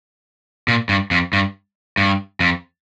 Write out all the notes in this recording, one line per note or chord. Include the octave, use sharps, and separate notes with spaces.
A#2
G2
F2
G2
G2
F2